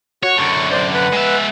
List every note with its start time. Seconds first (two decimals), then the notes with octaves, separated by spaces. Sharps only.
0.23 F#4 C#5
0.37 F#2 D3 C#6
0.71 C5 D5
0.94 B4 F#5
1.13 G#3 E5